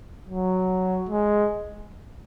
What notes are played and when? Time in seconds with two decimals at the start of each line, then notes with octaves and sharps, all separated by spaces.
0.25 F#3
1.09 G#3